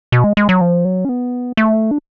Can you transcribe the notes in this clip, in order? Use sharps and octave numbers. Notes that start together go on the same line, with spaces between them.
B2
G#3
G#3
F#3
F3
F#3
C#4
B3
A3
D4